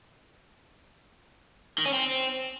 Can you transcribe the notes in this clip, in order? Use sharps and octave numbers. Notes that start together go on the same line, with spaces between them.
D#3
C#4
C4